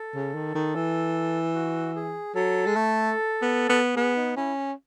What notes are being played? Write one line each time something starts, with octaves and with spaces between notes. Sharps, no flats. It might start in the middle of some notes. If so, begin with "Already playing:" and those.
Already playing: A4
C#3
D#3
D#3
E3
F#4
G#4
F#3 A4
G#3
A3
B3
B3
B3 G#4
D#4
C#4 E4